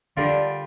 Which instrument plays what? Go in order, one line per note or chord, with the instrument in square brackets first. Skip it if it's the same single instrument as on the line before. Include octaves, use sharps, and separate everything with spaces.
[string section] D3 [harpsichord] G3 D4 F4 A#4